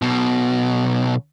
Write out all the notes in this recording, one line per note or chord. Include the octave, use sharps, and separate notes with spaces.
B1 B2